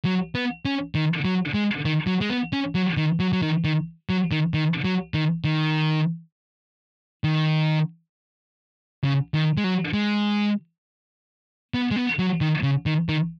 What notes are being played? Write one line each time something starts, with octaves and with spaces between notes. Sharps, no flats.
F#3
B3
C#4
D#3
F#3
G#3
D#3
F#3
G#3
B3
C#4
F#3
D#3
F#3
F#3
D#3
D#3
F#3
D#3
D#3
F#3
D#3
D#3
D#3
C#3
D#3
G#3
F#3
G#3
B3
G#3
B3
F#3
D#3
C#3
D#3
D#3